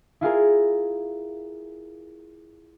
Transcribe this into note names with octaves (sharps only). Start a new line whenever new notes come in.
E4 F4 G#4 A#4